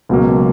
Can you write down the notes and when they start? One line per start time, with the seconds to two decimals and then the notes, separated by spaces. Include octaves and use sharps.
0.09 C#2 B2 F#3 A#3